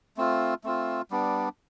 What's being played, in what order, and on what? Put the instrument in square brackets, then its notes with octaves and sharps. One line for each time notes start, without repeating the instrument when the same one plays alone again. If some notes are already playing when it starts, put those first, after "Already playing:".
[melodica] A3 C4 F4
A3 C4 F4
G3 B3 D4